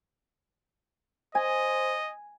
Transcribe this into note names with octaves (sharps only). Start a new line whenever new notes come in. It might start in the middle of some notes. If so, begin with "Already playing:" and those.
C5 D#5 G#5